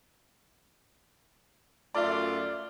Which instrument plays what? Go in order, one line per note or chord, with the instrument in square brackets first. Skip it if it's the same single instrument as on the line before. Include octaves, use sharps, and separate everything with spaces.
[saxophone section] F#2 A3 F4 [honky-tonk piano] D5 E5